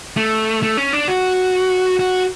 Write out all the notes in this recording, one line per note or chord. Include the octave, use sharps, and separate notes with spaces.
A3
A3
C#4
D4
F#4
F#4